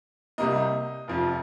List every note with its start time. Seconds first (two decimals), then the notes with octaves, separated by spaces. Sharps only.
0.38 C2 C3 G3 A#3 D#5
1.08 F1 F2 F3